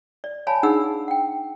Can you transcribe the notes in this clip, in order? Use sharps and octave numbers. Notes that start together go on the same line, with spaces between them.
D5
C#5 F5 G#5 A5 B5
D4 D#4 G#4 F#5 B5 E6
F#5 G5